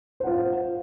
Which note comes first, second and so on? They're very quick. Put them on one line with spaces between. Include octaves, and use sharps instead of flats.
C5 F#5 F4